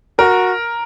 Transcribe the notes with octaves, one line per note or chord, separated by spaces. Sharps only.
F#4 A#4